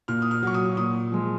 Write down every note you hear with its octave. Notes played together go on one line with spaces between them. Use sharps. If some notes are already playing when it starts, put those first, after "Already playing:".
A#2 F6
D#6
F6
F#3 C#6
D#6
A#2 D#6
F3 G#3